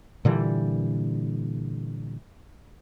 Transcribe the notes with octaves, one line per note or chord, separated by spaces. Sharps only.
A#2 D3 E3 G3